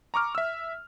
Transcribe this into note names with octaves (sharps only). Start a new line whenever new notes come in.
A#5 C#6 D6 F6
E5 E6